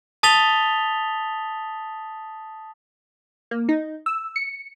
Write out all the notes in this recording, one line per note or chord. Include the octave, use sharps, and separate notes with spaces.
A5 D#6 A6 B6 F7 G7
A#3
D#4
E6
C#7